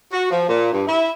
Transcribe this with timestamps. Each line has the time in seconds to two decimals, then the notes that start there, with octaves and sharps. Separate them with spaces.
0.12 F#4
0.31 F3
0.49 A#2
0.72 G2
0.88 E4